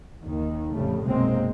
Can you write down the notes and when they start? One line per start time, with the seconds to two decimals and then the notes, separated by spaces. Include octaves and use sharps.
0.21 D#2 D#3
0.74 A1 F2 C#3 G3 A3
1.05 B1 F#2 C3 G#3 A#3 C4